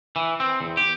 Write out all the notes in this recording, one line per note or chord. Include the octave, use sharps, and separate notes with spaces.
E3
C4
E2
G4